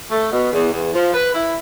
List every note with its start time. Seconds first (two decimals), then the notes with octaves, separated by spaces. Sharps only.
0.11 A3
0.32 B2
0.52 E2
0.73 E2
0.93 F3
1.14 B4
1.34 E4